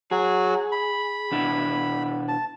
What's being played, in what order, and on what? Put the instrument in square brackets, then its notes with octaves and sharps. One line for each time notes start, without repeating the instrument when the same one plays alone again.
[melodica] F#3 F#4 [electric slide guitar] G#4
[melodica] B5
[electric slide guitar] B2 D4 E4
[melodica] A5